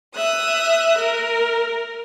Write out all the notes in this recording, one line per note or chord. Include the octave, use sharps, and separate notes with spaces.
E5 D#6 F#6
A#4